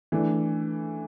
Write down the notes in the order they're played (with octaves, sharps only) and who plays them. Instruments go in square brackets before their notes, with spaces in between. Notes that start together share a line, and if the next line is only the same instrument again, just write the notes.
[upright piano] E3 A3 D4